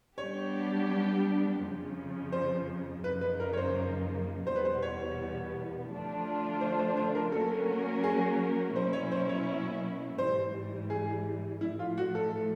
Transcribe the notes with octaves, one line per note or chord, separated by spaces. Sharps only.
G3 B3 D4 G4 C#5
F2 C#3 F3
C5
F#2 C#3 F3 A#3 D#4 B4
B4
A#4
C#5
C5
E2 B2 G3 B3 C5
B4
C5
C#5
D3 F3 A3 D4 F4
C5
C5
C5
A#4
F#3 A#3 C#4 F#4 A4 A#4
G#4
B2 F#3 A#3 C#4 E4 C5
C#5
C5
C#5
G#2 E3 G3 C5
G#4
A2 F3 A3 E4
F4
F#4
A4